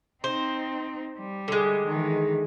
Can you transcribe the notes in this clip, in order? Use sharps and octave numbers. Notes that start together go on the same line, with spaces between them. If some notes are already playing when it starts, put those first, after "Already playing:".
C4 D#4 C5
G3
D3 G#3
D#3 E3